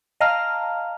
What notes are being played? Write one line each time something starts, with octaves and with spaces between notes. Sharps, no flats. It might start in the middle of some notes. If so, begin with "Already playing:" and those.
D#5 F5 G5 A5 A#5 F6